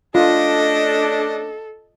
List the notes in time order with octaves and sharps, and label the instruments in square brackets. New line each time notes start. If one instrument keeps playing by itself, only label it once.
[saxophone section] A3 C#4 D4 [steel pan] F4 [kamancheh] A4 [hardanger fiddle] D#5